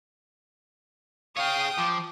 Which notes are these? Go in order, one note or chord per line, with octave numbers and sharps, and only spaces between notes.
G#4 C#5 F5 G5 D#6
F3 D6